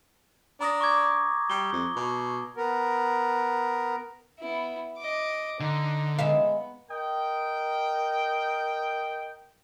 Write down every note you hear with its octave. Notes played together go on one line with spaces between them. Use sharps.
D4 A#5 D#6 A#6
C#6 D6 G#6
G3 G7
F2
B2
B3 A#4
B3 E4
D#5 D6
D3 D#4
G#3 B3 E5 F5
A#4 D#5 G5